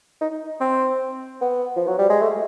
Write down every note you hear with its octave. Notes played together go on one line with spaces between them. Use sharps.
D#4
C4
B3
F3
F#3
G3
G#3
A3